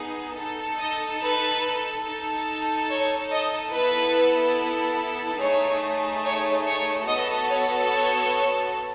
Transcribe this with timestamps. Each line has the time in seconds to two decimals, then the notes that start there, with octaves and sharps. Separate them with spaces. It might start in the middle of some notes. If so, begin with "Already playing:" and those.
Already playing: B3 D#4 G#4
0.37 D#4 A4
0.80 D#5
1.22 B4
2.05 D#4 A4
2.89 C#5
3.31 D#5
3.73 B3 E4 A4 B4
5.41 A3 D#4 G#4 C#5
6.25 C#5
6.67 C#5
7.08 B3 F#4 A4 D#5
7.51 C#5
7.92 C#5